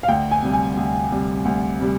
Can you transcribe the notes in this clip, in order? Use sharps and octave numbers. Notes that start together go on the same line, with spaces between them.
F5
D2 G5
G#5
C3 G3
G#5
D2
C3 G3
D2
C3 G3